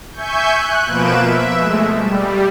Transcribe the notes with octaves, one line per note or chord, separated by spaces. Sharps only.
E5 G#5 C#6 G6
F#6
B2 F3 A#3 B4 D7 E7
E5
G#3 A3
G3